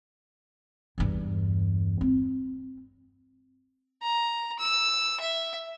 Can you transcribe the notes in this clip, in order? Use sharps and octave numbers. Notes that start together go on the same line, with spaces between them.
E2 G2
C4
A#5
E6
E5